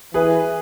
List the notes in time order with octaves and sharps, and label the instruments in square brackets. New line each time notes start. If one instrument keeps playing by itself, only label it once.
[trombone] E3 [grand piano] G#4 B4